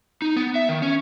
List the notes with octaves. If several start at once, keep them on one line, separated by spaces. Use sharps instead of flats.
D#4
B3
E5
D#3
C#4